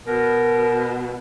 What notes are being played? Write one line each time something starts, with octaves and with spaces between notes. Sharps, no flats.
B2 A#4